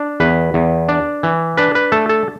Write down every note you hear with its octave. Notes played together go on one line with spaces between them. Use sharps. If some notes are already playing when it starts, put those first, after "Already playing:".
Already playing: D4
E2 B4
E2
D4
E3
D4 B4
B4
A3 A4
A4